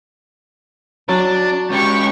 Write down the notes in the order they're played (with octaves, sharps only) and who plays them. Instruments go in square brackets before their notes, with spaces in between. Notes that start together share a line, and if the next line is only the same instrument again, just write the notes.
[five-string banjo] F#3 [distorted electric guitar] D4
[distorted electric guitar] C#2 [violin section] G4 C#6